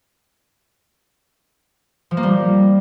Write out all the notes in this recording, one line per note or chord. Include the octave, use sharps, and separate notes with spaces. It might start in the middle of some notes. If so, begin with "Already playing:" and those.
F3
A#3
G3